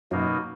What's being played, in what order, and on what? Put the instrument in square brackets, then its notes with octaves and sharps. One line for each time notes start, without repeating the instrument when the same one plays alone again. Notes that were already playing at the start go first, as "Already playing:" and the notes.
[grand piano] F#2 F#3 [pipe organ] B2 A#3 D#4